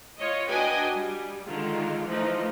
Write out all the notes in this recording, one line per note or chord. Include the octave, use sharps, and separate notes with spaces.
F4 C#5 D#5
D4 F#4 B4 D#5 G5 G#5
G3
D3 D#3 G#3 F4
E3 F3 A3 D#4